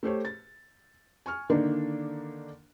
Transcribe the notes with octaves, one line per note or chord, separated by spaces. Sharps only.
A3 G4 C5 C#5
A6
G#5 C#6 F6
D3 D#3 A#3 D4 D#4